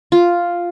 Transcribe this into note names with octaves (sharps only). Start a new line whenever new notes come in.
F4